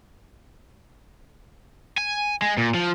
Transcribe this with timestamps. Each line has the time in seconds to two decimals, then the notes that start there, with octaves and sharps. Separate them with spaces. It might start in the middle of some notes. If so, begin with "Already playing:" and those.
1.98 G#5
2.42 G#3
2.58 A#2
2.74 F3